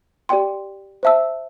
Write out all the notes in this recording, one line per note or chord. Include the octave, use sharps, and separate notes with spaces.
G4 D5 G5 C6
C5 E5 A5 E6